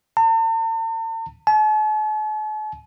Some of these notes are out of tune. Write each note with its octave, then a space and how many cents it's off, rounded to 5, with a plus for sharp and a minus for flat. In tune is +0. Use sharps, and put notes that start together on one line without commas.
A5 +45
A5 -45